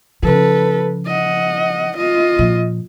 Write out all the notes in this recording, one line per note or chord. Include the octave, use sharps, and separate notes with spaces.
C#3 F3 A4 B4
D#5 F#5
F4 D#5
A#2 F3